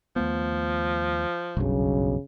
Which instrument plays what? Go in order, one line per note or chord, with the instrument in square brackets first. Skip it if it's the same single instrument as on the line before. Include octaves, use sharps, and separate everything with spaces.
[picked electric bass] D#2 A3 B3 [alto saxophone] F3
[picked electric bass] F#1 G2 [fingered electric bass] B1 F#3 [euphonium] C#3